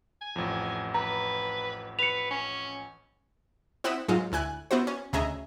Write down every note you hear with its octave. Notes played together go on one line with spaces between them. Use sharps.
G#5
A1 F2
B4 A#5
B4 C#7 F7
C#4
C4 E4 F#5 D#6 B6 E7
G#2 F#3 G#3 D#4 F4
D2 E4 G#5 F#6
B3 E4 F#4 C5
C#4
D2 C#3 D#5 E5 G#5 A#5